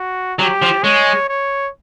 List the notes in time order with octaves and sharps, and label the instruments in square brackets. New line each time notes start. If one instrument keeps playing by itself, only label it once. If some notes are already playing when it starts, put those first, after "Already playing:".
Already playing: [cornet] F#4
[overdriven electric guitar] F#3 [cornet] G4
[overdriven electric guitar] F3
[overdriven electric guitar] G#3 [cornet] C#5
[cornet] C#5